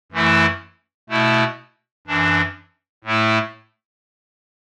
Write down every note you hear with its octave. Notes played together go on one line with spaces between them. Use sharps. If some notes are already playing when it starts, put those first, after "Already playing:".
F#2 E3 A3 E4
B2 A3 E4
F#2 E3 D4
A2 A3 E4